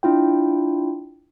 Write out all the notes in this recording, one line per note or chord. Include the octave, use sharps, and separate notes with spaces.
D4 E4 F4 G5